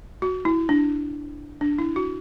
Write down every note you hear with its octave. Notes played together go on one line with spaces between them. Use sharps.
F#4
E4
D4
D4
E4
F#4